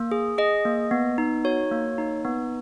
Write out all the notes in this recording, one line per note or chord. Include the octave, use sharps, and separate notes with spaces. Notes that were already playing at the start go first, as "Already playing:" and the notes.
Already playing: A#3
G#4
G#4 D#5
A#3
B3
D#4
F#4 C#5
A#3
D#4
B3